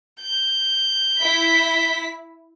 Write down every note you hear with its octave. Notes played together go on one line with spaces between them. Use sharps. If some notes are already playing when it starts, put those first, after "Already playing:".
G6
E4 B6